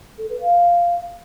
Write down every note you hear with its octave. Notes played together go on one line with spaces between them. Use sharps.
A4
B4
F5